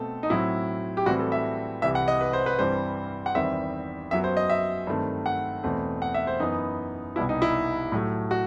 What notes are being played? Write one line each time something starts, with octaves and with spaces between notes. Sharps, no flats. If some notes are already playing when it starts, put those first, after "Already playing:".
Already playing: B2 A3 C4 A4
D#4
A2 F#3 C4 E4
G4
A2 E3 G3 C4 F#4
A4
E5
C2 C3 E3 E5
F#5
D#5
B4
C5
B4
G2 E3 G3 C4 C5
F#5
E2 D#3 G3 C4 E5
F#2 F#3 B3 E5
C5
D#5
E5
G2 D#3 A3 C4
F#5
E2 B2 A3 C4
F#5
E5
C5
F#2 E3 B3 D#4
C2 B2 G3 E4
D#4
E4
A2 F#3 A3
F#4